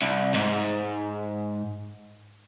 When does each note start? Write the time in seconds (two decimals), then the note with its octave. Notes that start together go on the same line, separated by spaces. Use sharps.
0.02 C2
0.34 G#2